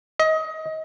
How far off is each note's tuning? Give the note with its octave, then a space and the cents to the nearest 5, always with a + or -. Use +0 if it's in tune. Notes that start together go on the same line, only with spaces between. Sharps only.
D#5 +25